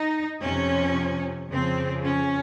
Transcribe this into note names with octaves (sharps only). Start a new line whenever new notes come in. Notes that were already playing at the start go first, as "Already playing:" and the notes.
Already playing: D#4
F2 C3 F3 C#4
F2 C#3 F3 C4
C#4